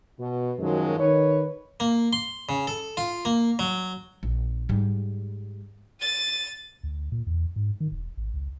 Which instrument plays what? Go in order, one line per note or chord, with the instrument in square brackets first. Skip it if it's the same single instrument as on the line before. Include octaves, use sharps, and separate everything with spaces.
[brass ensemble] B2
F#2 D#3 F3 F#3 G#3
D#3 B4 C#5
[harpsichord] A#3
C6
C#3
A4
F4
A#3
F#3
[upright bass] A#1
G#2 G3
[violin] A6 D#7
[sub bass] D2
A#2
E2
G#2
D#3
E1
G#1
C#2